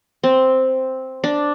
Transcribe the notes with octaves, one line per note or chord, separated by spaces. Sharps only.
C4
D4